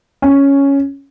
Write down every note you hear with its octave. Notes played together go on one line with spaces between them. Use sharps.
C#4